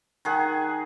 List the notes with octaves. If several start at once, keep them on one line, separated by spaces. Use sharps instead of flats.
D#3 G#4 F#5